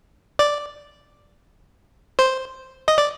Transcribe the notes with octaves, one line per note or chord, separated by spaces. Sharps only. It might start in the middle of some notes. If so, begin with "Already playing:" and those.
D5
C5
D#5
D5